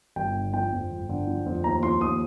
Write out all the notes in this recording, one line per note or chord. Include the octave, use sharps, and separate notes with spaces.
G1 G5
D3
F3 G5
F2
G1
D3
F3
F2
D#2 A#5
F3 C6
D#2 D#6